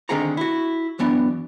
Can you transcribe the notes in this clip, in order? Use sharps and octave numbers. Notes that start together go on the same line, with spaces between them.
D3 D#3 C4 G#4 F#5 A#5
E4 F#4
F#2 E3 B3 D4 D5